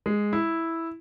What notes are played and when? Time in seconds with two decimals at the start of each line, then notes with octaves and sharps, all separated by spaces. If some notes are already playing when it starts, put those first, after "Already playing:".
0.06 G#3
0.33 E4